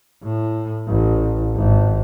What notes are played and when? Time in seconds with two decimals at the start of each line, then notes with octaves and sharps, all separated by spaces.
0.23 A2
0.88 A1
1.55 G#1